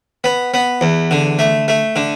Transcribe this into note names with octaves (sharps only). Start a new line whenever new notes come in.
B3
B3
E2
D3
A3
A3
D3